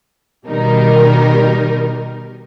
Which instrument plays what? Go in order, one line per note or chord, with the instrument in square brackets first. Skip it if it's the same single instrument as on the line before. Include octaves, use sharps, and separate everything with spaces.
[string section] B2 D#3 G3 D#4 A#4